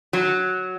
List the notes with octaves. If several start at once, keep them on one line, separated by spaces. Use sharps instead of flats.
F#3